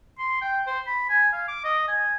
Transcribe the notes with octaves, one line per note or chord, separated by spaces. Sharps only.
C6
G5
C5
B5
G#5
F5
D6
D#5
G#5